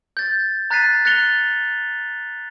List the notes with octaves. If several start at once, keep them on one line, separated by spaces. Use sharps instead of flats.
G6 A6
A#5 F#6 A6 B6 C7 D#7
F#6 A6 A#6 C#7 F7 G7